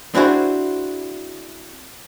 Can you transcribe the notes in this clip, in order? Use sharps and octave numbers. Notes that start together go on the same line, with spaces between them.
C4 D4 E4 F#4 G#4 C5